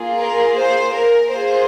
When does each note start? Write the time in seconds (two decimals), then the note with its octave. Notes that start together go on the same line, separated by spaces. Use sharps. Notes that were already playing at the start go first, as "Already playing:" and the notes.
Already playing: A#3 F4 G#4
0.18 A#4
0.56 C5
0.94 A#4
1.31 A#3 F4 G#4 C5